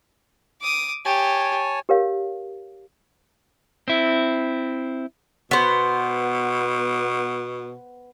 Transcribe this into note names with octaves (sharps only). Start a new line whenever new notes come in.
D6 D#6
G4 C#5 G#5 A5
G4 A#4 C#5 F5
C4 E4
B2 B3 C5